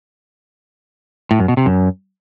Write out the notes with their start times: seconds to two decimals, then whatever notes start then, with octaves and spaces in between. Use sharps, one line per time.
1.31 A2
1.40 F#2
1.48 B2
1.57 C3
1.66 F#2